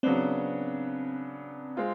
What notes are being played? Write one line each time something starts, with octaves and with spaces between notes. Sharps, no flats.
C#3 F#3 B3 C4 D4
G#3 C4 F4